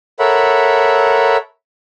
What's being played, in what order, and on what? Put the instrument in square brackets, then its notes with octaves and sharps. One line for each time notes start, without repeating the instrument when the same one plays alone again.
[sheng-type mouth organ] A4 A#4 C#5 E5 F#5 B5